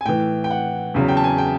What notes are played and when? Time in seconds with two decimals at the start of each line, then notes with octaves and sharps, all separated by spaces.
0.01 G#5
0.06 A2 E3 G5
0.44 G5
0.50 F#5
0.94 E2 C#3 F#3
1.08 G5
1.17 A5
1.24 G#5
1.38 G5